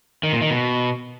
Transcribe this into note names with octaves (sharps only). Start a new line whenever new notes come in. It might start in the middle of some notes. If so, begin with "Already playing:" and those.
D#3
A#2
D#3
B2